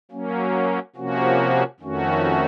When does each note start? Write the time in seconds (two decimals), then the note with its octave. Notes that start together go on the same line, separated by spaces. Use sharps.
0.11 F#3 A#3 C#4
0.96 C3 F3 A#3 C#4 F#4
1.80 F2 D#3 A3 C#4 F#4